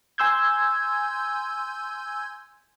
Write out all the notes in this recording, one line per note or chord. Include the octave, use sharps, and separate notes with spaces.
G#5 C6 E6 G6 G#6